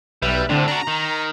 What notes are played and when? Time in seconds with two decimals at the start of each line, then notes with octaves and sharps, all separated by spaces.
0.22 B1 G3 B4 E5
0.49 A2 D3 C4 D4
0.68 D4 F#4 A#5
0.87 D#3